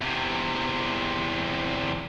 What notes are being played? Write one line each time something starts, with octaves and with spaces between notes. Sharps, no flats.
E2 C3